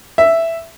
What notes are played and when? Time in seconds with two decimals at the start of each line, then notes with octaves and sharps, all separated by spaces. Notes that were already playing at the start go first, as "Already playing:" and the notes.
0.18 E5